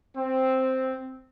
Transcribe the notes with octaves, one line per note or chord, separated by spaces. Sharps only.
C4